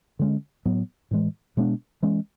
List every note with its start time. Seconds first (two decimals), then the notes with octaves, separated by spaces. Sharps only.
0.19 D3 G#3 C#4
0.65 A2 F#3 B3
1.11 A2 E3 G#3
1.57 B2 G#3 B3 D4
2.02 E3 G#3 C#4